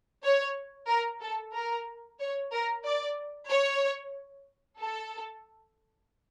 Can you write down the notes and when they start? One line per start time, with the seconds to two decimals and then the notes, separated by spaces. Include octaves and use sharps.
0.23 C#5
0.88 A#4
1.20 A4
1.53 A#4
2.19 C#5
2.51 A#4
2.84 D5
3.49 C#5
4.80 A4